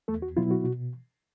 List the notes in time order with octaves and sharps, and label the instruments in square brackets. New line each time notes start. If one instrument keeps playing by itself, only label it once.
[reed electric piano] E2 A3 A4
F#4
B2 F#3 B3 E4 F4
F#4
B2